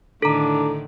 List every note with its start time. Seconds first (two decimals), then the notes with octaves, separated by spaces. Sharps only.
0.22 A2 D3 D#3 D4 A4 A#5